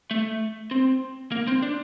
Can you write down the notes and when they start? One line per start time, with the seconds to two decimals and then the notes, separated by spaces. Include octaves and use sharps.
0.11 A3
0.71 C4
1.32 A#3
1.47 C4
1.62 D4